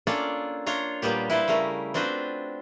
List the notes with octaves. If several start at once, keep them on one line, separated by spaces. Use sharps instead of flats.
A#3 C#4 D4 F4 A4 D5
D4 F4 C#5 A#5
A#2 G3 A#3 B3 G4
E4 B4 C5 D5
C#3 G3 A3 A#4
C4 D4 F4 F#4 B4 C5